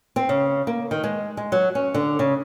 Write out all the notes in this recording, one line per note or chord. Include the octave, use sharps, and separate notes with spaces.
C4
C#3
A#3
D#3
G#3
G#3
F#3
C#4
D3
C#3